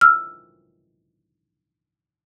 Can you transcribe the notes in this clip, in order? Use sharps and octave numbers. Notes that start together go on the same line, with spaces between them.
E6 F6